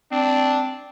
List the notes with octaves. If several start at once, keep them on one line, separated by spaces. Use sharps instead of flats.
C4 D4